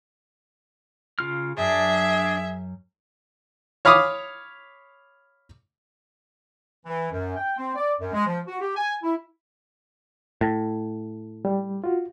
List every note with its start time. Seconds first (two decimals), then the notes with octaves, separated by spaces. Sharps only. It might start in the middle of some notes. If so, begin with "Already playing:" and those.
1.19 C#3 F4 F6
1.57 F#2 D4 G#4 E5
3.85 C#5 F5 B5 D6 D#6
6.85 E3
7.11 F#2
7.36 G5
7.57 C4
7.75 D5
8.00 F#2
8.13 G#3
8.26 F3
8.47 F#4
8.61 G4
8.76 G#5
9.03 E4
10.41 A2
11.45 G3
11.84 F4 F#4